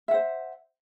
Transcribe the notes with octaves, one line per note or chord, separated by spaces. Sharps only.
C5 E5 F#5